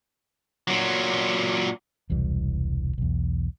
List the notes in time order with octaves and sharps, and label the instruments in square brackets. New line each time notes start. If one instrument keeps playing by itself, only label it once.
[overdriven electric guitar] A#2 F#3
[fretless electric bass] E1 C2 E3 G3
B1 E2